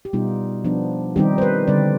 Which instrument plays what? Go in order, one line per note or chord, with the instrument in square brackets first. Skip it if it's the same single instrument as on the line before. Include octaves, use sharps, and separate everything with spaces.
[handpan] G4
B2 G3 B3 D#4 F4
F3 B3 D4
D#3 G3 C4 D#4 G4
C5
B4
D3 G3 C4 D5